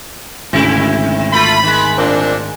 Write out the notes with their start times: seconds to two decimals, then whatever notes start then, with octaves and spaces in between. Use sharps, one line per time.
0.53 G#1 D2 C3 E4
1.33 A3 F4 B5
1.63 D#3 G#3
1.98 A#2 C4 D4